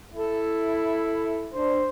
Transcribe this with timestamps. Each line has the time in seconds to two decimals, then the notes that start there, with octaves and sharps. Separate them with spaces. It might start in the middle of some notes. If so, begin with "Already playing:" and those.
0.14 E4 A4
1.53 D4 C5